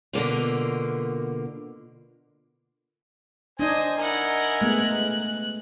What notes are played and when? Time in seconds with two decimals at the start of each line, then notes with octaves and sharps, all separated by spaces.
0.13 B2 D3 A#3 F4
3.59 D4 D#4 C5 D#5 G#5 D#6
3.97 E4 A#4 D#5 F#5 G#5
4.61 G#3 A3 B3 F#6